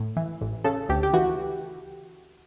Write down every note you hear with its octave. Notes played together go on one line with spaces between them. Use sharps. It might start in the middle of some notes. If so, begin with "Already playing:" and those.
Already playing: A2
E3
A1
C#3 A4
D2 G4
G4
E3 F#4